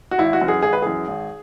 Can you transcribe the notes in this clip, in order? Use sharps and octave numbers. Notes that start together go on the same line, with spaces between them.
F#4
G#1 E4
F#4
F#2 E3
G#4
G#1 G#4
B4
F#2 E3 G#4
G#1